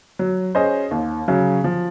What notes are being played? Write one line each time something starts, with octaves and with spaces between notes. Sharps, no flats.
F#3
C#4 G#4 C5 D#5
D#2
C#3 F#3 C#4
F3